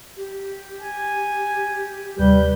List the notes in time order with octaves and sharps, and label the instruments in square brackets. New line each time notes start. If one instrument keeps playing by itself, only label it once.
[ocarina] G4
[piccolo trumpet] G#5
[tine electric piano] D#2 C3 [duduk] G3 [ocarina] B4 [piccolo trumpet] G6